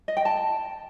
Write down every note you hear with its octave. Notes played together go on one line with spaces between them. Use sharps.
D#5
G5
A5